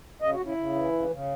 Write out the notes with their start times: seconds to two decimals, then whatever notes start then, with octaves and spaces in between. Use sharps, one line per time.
0.21 C#3 D#5
0.34 F#4
0.39 C#3
0.46 E4
0.57 C#3
0.75 E3
0.93 C#3
1.11 C#3